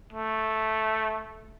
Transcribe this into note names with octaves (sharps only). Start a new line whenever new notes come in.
A3